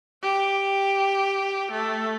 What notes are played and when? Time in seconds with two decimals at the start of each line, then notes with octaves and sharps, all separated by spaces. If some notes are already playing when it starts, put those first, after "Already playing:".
0.23 G4
1.71 A3